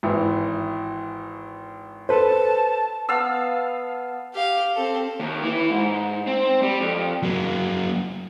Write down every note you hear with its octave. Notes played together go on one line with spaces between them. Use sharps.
G#1 E3
A4 B4 C5 A5
B3 F5 A5 E6
G4 F5
C4 A4
D#2
E3
G#2
C4
G3
F2
F#3 A#3